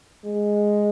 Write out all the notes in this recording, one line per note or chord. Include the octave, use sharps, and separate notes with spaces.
G#3